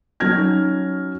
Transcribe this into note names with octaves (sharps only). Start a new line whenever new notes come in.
F#3 C#4 D#4 F6 G#6 A#6